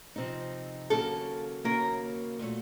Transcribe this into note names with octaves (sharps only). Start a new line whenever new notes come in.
C3 F3 C4 D#4
D#2 C#3 F#3 A#3 A4
D#2 C#3 F#3 A#3 A#4
A#2 F#3 A3